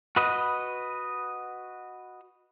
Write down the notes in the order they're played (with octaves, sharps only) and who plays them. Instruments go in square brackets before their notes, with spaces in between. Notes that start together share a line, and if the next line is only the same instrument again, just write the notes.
[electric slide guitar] F#4 B4 D#5